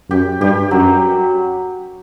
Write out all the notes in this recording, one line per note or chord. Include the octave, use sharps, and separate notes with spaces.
F#2 G4
G2 G4
F#2 F#3